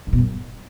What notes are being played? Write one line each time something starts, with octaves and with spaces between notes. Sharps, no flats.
G2
B2
F#2